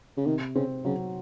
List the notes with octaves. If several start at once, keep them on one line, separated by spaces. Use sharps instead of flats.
C#3
C3 D#3
C#3 C4
C#3 F#3